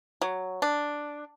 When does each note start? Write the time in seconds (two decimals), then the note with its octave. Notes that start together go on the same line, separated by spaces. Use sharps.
0.22 F#3
0.62 D4